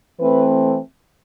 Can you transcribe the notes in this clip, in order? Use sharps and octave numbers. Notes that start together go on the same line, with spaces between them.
E3 A3 C4 B4